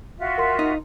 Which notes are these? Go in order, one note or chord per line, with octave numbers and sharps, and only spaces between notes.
F4 F#4 E5
A#4 C6
D#4